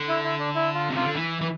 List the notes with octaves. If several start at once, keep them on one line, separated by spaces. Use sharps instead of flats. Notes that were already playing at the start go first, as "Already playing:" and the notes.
Already playing: D3
E4
E4
D4
E4
F4
C3
F4
D3
E3
E3